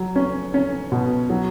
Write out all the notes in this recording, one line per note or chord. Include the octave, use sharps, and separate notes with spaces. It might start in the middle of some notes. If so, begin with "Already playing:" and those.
Already playing: F#3
C#4
C#4
B2
F#3